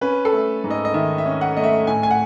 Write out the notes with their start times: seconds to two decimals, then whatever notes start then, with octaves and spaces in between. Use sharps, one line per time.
0.01 C#4 B4
0.25 A4
0.33 A3
0.64 G#2
0.71 D#5
0.85 D#5
0.94 D#3 E5
1.18 E5
1.26 C#4
1.41 F#5
1.57 A3 D#5
1.64 E5
1.87 A2 G#5
2.03 G#5
2.11 F#5